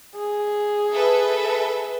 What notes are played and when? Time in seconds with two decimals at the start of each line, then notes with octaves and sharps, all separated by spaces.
0.16 G#4
0.92 A4 B4 E5